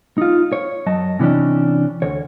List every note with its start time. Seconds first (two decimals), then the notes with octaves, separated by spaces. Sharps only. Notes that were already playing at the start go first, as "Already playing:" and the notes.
0.18 D#4 F4
0.53 C#5
0.86 F#2 F#3 D#5 A5
1.19 C3 E3 G3 C#4 D4
2.02 D2 C#5